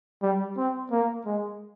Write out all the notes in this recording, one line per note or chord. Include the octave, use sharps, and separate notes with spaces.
G3
C4
A#3
G#3